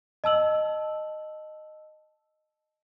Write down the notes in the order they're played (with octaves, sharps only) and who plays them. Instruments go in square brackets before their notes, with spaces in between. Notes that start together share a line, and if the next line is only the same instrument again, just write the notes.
[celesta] D#5 A5 E6 F#7